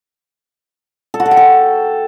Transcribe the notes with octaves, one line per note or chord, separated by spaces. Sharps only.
A4
F#4
A4
G5
A4